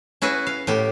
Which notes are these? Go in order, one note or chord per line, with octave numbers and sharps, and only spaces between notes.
C#4 E4 F#4 G#4 B4
F5
A2 B3 G4